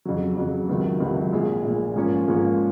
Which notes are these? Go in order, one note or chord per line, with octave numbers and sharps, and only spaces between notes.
F2 C#3 F#3
F2 C#3 F#3
C#2 C3 D#3 F#3
C#2 C3 D#3 F#3
A#1 A#2 G#3
A#1 A#2 G#3
G#2 F3 A#3 C#4
G#2 F3 A#3 C#4